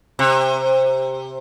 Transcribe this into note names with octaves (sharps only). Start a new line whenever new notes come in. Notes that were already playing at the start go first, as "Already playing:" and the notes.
C3